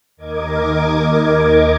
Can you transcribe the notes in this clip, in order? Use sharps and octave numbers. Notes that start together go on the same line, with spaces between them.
D#2 A#4 D#5 D6 G#6